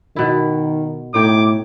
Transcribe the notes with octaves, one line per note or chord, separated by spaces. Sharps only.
B2 D#3 E4
A2 D#4 C#5 G5 D6